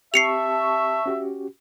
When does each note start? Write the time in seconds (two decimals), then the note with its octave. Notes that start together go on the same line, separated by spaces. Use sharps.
0.14 C4 G4 E5 A5 C#6 C7 C#7 F7
1.06 C#4 F#4 G4